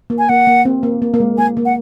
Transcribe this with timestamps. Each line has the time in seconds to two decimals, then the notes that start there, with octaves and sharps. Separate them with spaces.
0.10 A#3
0.19 G#5
0.29 A#3 F#5
0.47 A#3
0.65 C4
0.83 A#3
1.02 A#3
1.14 A#3
1.20 G#3
1.38 A#3 G#5
1.57 A#3
1.65 F#5